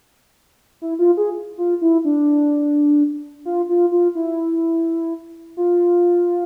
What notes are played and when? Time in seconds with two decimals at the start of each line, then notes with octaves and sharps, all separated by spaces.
0.82 E4
0.99 F4
1.17 G#4
1.58 F4
1.81 E4
2.05 D4
3.45 F4
3.69 F4
3.92 F4
4.15 E4
5.57 F4